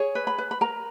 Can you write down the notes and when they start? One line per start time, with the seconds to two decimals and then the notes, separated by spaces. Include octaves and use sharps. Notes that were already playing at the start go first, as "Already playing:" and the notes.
Already playing: G#4 C#5
0.15 B4
0.27 B5
0.38 B4
0.51 B5
0.61 A#4 A#5